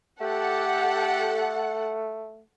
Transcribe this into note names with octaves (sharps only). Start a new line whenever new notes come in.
A3 G4 A4 F#5